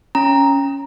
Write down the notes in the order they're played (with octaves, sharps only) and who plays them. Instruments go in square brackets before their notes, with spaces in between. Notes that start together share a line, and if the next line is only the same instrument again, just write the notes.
[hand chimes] C#4 A#5